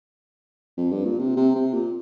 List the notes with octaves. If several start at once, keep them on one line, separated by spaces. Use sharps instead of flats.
F2
G2
A#2
C3
C3
C3
A#2